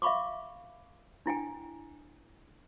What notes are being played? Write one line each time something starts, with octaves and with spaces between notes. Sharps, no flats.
E5 F5 B5 C#6 D6
D4 E4 G5 G#5